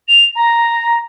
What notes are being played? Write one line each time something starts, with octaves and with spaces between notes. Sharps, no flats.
F7
A#5